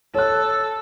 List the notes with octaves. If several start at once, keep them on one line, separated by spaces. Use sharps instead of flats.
A4 C#5 F#6